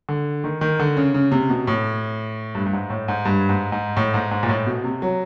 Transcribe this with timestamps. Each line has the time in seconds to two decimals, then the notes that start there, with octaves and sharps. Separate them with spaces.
0.09 D3
0.44 D#3
0.61 D#3
0.80 D3
0.97 C#3
1.14 C#3
1.31 C3
1.49 B2
1.67 A2
2.55 G2
2.66 G2
2.73 G#2
2.90 A2
3.08 G#2
3.25 G2
3.49 G#2
3.72 G#2
3.97 A2
4.14 G#2
4.31 G#2
4.43 A#2
4.49 A2
4.66 B2
4.84 C3
5.02 F#3